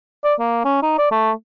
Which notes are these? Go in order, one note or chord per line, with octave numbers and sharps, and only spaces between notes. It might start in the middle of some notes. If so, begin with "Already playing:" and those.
D5
A#3
C#4
D#4
D5
A3